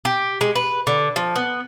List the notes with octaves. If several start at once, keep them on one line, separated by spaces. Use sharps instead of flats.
G4
G#3
B4
D3
F3
B3